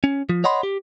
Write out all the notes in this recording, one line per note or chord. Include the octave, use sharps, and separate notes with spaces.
C#4
F3
C#5 D#5 F#5 B5 C6
G4